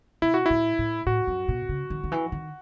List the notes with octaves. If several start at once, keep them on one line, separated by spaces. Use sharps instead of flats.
B2 E4
F#4
A2 E4
A2
A2 F#4
F#2
B2
C#3
D#3
D#3
E3
D#3